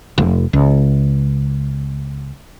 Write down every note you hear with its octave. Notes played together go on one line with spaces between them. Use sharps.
F1
C#2